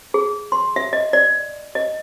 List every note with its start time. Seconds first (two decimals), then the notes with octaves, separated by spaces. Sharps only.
0.14 G#4
0.52 C6
0.76 E5
0.93 D#5
1.13 D5
1.75 D#5